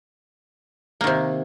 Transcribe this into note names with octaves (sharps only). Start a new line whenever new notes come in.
C3 D#3 A#3